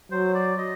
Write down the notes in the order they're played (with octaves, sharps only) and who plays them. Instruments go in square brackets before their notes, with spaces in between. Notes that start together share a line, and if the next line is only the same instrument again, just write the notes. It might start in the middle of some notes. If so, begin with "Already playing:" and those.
[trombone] F#3 [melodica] C5
[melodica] D5
D#5